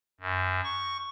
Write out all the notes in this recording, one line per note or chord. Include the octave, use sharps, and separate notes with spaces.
F#2
C#6